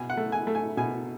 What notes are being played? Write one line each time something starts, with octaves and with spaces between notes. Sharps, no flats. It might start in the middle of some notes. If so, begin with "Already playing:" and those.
Already playing: B2 G#5
F#5
A3
G#5
A3
G#5
B2 G#5